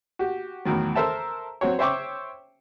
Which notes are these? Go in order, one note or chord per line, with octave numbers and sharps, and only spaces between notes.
F#4 G4
E2 A2 D#3 F#3
A4 A#4 C5 E5 A5
F#3 C4 F#4 C#5
C5 C#5 E5 G5 C#6 D6